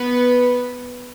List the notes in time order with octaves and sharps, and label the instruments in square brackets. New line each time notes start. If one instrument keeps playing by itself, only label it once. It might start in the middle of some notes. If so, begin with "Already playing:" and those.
Already playing: [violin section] B3 B4